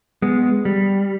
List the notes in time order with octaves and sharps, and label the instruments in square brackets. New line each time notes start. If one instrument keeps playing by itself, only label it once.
[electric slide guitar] G#3 B3
G3